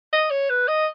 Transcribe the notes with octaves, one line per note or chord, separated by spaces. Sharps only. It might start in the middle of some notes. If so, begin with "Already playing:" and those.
D#5
C#5
B4
D#5